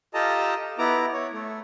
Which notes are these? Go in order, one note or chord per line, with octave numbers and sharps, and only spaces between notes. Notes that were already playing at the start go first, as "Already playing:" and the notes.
F4 G4 A4 D#5 A5 A#5
B3 E4 A#5 D6
C#5
A3